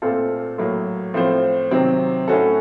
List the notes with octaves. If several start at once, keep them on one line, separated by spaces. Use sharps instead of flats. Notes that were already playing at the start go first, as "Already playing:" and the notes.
A#2 A3 C4 F4 A4
A2 F#3 A#3
A2 F3 C4 F4 C5
C3 D#3 F#3 C4
A2 A3 C#4 F#4 A4